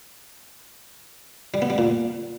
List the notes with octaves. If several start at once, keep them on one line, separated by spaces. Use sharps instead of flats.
G3
B3
G3
A#2